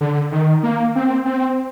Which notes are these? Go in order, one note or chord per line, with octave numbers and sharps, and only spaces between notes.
D3
D#3
A#3
C4
C4